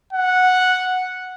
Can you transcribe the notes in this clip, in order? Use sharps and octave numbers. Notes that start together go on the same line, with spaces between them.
F#5